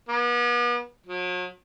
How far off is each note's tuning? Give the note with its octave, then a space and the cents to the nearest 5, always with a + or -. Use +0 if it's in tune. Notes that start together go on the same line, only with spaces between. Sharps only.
B3 -40
F#3 -40